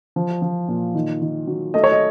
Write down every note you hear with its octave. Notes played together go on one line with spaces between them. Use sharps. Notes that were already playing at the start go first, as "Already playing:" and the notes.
F3
F3
A#2
D#3
D#3
F#3
A3 D#5
C#5
D#5